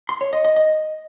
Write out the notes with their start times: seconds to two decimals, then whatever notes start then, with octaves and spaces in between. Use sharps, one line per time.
0.09 C6
0.21 C#5
0.33 D#5
0.45 D#5
0.56 D#5